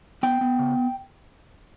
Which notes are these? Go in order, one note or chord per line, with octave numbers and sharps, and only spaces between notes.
B3 G5
B3
C#3